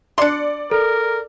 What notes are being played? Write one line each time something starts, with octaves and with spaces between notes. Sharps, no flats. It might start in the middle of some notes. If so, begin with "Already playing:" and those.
D4 D5 C6 C#7
A4 A#4